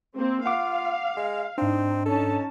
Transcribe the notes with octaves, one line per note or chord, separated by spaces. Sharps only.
A#3 C4
F4 F5 F#5 D6
G#3
G#2 C4 D4 D#4
C#4 D#4 A4 A5